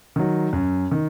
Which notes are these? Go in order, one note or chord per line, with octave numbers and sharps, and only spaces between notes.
D#3 F#3
F#2
D#3